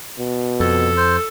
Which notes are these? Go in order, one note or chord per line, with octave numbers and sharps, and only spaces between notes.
B2
F2 A4
C5